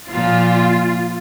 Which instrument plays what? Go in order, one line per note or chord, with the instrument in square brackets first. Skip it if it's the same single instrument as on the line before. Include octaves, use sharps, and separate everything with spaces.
[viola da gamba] A#2 F3 [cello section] F4